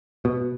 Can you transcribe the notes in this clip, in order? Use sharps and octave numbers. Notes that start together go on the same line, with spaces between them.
B2